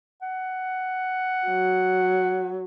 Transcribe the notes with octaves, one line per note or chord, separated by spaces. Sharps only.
F#5
F#3